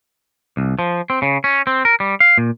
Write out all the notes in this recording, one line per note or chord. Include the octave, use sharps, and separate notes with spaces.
C2
F3
C4
C#3
C#4
C4
A#4
G3
F5
A#2